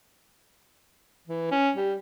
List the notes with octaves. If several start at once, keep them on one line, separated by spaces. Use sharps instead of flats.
E3
C#4
G3